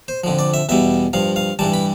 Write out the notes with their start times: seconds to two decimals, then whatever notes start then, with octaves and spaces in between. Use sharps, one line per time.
0.08 C5
0.24 F2 D3 F3
0.39 D5
0.54 E5
0.69 E2 B2 G3 E5
1.13 G2 F3 F5
1.36 F5
1.59 G2 E3 G3 A5
1.74 B5